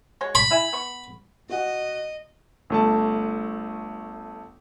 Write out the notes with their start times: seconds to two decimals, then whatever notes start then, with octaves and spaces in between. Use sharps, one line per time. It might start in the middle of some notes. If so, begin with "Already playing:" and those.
0.21 G#3 F#4 C#5
0.35 B5
0.50 E4 E5 G#5
0.73 B3 C#6
1.49 F#4 D#5 F#5
2.70 G1 A3 A5